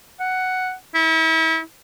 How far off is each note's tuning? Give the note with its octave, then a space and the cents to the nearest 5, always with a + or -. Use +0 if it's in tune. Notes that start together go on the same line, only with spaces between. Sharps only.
F#5 +5
E4 -35